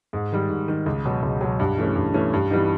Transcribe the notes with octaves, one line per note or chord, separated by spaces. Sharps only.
G#2
D#3 G3
G#2
D#3 G3
C#2
B2 F#3
C#2
B2 F#3
G2
E3 A3 C#4
G2
E3 A3 C#4
G2
E3 G3 B3 D#4